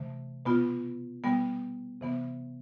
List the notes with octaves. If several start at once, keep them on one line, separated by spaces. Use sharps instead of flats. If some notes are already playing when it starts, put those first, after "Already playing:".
Already playing: C3 E3 A3
B2 B3 F4
B2 G3 B3
C3 E3 B3